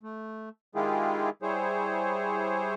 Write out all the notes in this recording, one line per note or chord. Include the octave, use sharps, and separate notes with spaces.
A3
D#3 G#3 E4 F4 G4 G#4
G3 E4 G#4 C5 C#5